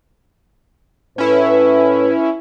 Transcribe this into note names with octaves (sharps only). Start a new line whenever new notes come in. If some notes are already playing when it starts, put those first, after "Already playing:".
A2 C#4 E4 B4